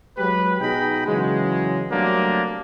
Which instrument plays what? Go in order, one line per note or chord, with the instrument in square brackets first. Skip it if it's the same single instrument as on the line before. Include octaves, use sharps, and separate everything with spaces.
[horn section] F#3 G#3 G4 B4
B2 D#4 G#4 D#5 G5 B5
C#3 E3 F#3 G#3
F#3 G3 A3 A#3 C4 D4